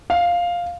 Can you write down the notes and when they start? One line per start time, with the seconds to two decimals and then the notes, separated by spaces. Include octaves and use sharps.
0.10 F5